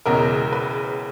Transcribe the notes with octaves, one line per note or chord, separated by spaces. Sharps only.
E1 E2 C#3 G#3 A#4
B4